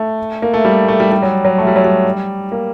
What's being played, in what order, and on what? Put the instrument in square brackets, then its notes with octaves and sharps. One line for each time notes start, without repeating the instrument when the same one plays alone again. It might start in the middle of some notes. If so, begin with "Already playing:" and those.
Already playing: [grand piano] A3
A#3
A3
G3
A3
G3
G3
F#3
F#3
A3
G3
F#3
G3
A#3